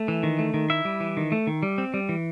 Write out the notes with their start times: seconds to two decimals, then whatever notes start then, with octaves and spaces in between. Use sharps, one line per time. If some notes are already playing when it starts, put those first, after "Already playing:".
Already playing: A3
0.08 E3
0.23 D#3
0.39 A3
0.54 D#3
0.70 E4 E5
0.85 G3
1.00 E3
1.17 D#3
1.32 A3
1.47 D#3
1.63 G3
1.78 C4
1.94 G3
2.09 E3